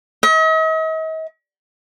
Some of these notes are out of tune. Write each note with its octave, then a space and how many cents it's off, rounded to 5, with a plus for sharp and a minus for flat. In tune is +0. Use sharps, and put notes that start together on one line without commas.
D#5 +45